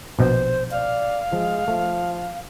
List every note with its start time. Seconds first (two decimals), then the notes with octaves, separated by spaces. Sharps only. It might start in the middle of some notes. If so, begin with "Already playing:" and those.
0.19 A#1 B2 C5 D#5
0.71 D5 F5
1.33 F3 G#3
1.68 F3 A3